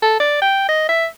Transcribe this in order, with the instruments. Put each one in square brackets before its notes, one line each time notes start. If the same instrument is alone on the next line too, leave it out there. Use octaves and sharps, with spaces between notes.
[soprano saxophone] A4
D5
G5
D#5
E5